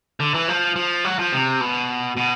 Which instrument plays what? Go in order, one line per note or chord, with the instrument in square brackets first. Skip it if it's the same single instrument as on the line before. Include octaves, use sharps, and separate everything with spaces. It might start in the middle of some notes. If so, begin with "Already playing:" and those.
[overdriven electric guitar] D3
E3
F3
F3
F#3
F3
C3
B2
B2